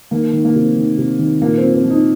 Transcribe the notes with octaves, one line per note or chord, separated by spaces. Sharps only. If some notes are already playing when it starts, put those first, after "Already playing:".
D#3 A#3
D#3
A#3
C3
D#3
C3
D#3
A#2 A#3
C4
F3
C4
F3
D#4